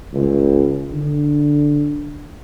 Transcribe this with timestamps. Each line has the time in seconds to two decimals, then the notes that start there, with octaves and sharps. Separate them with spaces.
0.13 C#2
0.92 D3